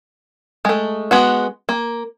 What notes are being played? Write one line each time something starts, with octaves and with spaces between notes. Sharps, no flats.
G#3 A3
G#3 B3 F#4
A#3